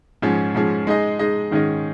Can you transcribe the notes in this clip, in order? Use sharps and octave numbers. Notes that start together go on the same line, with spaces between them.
G#2 F3 C#4 G#4
G#2 F3 C#4 G#4
G#3 D#4 G#4 D#5
G#3 D#4 G#4 D#5
G#2 D#3 C#4 G#4 D#5